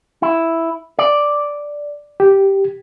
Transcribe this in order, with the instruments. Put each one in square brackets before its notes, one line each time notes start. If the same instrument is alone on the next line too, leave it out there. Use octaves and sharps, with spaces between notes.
[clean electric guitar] E4
D5
[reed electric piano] G4